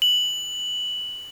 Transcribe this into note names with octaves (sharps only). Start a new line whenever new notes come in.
F#7